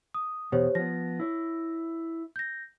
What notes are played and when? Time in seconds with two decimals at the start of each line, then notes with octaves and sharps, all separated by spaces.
0.14 D#6
0.52 E2 B2 G4 C5 C#5
0.75 F3 B3 A#6
1.20 E4 C#5
2.36 G6 A#6